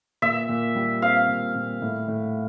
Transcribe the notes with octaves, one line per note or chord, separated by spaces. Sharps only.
A#2 E5
A#2
G3
C4 F5
A#2
A#2
A2
A2